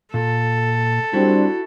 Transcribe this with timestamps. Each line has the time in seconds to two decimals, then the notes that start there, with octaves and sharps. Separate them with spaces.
0.14 A#2 A4
1.13 G3 C4 D4 E4 F#4